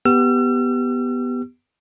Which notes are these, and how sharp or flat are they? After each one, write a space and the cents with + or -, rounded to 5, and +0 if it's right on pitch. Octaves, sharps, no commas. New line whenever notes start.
B3 +0 G4 +0 E6 +45